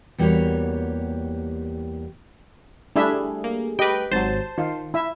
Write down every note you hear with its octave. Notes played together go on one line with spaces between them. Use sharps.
E2 G3 A#3 F#4 G4 C#5
G3 A3 D4 E4 G#4 E5
A#3
G4 B4 D#5 G5
G#1 F#3 C5 A5
D#3 F4
E4 E5